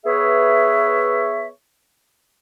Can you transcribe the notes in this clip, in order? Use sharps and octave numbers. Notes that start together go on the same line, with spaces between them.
B3 G#4 B4 C#5 E5